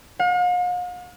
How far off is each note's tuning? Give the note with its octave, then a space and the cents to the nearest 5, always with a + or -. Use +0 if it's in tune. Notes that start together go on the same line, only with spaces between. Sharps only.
F5 +45